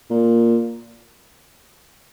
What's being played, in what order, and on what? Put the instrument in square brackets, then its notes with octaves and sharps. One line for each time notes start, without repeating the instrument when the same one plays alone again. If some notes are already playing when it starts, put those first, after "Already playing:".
[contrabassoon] A#2